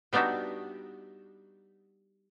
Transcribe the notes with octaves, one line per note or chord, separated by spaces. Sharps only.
G3 B3 D4 D#4 F#4 E5